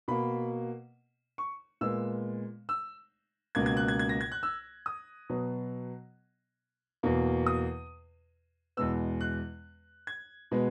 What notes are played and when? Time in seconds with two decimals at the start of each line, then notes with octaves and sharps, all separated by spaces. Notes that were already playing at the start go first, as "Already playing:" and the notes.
0.08 B2 A#3 B5
1.38 C#6
1.81 A#2 G#3 B3 E6
2.69 E6
3.55 C#2 B2 A#3 G#6
3.66 G#6
3.77 F#6
3.88 G#6
3.99 G#6
4.09 A#6
4.21 G#6
4.32 F#6
4.43 E6
4.86 D#6
5.29 B2 F#3 B3
7.03 E2 B2 A#3
7.46 D#6
8.77 E2 B2 G#3 B3 E6
9.21 F#6
10.07 G#6
10.51 B2 G#3 B3